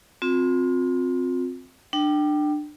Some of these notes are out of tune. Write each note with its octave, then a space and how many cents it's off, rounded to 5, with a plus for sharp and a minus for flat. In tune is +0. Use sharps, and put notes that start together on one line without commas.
C4 +0 F4 +40
D4 +25 G5 -15